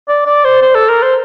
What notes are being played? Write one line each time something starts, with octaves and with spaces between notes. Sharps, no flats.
D5
D5
C5
C5
A4
A#4
C5